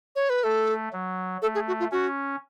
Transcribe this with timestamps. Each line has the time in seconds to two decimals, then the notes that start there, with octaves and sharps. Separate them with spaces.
0.16 C#5
0.30 B4
0.44 A3 A4
0.93 F#3
1.42 A3 A4
1.55 G#4
1.68 F#4
1.80 F4
1.92 C#4 F#4